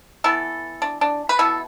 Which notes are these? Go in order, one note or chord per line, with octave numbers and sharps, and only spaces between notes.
E3 B3 E4 A4
D4
D4
B4
B2 B3 E4 A4